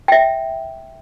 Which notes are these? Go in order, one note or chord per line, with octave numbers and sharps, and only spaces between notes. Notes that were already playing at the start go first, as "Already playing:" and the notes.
E5 G5